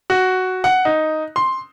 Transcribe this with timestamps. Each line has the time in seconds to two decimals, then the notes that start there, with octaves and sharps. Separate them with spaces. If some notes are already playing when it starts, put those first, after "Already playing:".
0.10 F#4
0.64 F#5
0.85 D#4
1.36 C6